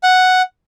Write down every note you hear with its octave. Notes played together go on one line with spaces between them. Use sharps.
F#5